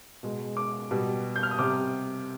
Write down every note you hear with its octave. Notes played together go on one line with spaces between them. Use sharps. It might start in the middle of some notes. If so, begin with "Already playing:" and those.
B2 G#3
D6
B2 G3
G6
F6
D#6
C3 G3 D6